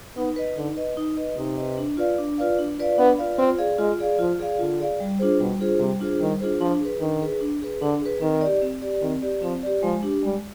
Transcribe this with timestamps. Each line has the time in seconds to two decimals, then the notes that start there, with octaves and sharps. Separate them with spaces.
0.17 B3 D#4
0.36 B4 D#5
0.57 D3 D#4
0.76 B4 D#5
0.97 D#4
1.17 B4 D#5
1.37 C3 D#4
1.57 B4 D#5
1.78 D4
1.97 F4 B4 D5 F5
2.19 D4
2.38 F4 B4 D5 F5
2.59 D4
2.78 F4 B4 D5 F5
2.98 B3 D4
3.18 F4 B4 D5 F5
3.38 C4 F4
3.58 G#4 D5 F5
3.78 G#3 F4
3.99 G#4 D5 F5
4.19 F3 F4
4.40 G#4 D5 F5
4.59 D3 F4
4.79 G#4 D5 F5
5.00 G3
5.19 D4 F4 G#4 C5
5.40 B2 G3
5.59 D4 F4 G#4 C5
5.79 C3 G3
6.00 D4 F4 G#4 C5
6.20 D#3 G3
6.40 D4 F4 G#4 C5
6.60 F3 D4
6.80 G#4 B4
7.00 D#3 D4
7.21 G#4 B4
7.41 D4
7.61 G#4 B4
7.82 D3 D4
8.01 G#4 B4
8.21 D#3 C4
8.41 G4 D5
8.62 C4
8.82 G4 D5
9.02 D#3 C4
9.22 G4 D5
9.42 F3 C4
9.63 G4 D5
9.83 F3 G#3
10.03 D4 G4
10.23 G3 G#3